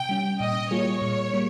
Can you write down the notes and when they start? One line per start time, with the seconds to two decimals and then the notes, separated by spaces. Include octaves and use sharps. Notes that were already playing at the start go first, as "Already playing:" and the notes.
Already playing: C3 G5
0.09 G3 C#4
0.40 A#2 D#5
0.71 G3 A#3 F4 G#4 C#5
1.02 A#2
1.33 G3 A#3